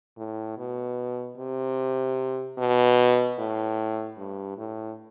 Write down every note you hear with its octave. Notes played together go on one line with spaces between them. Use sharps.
A2
B2
C3
B2
A2
G2
A2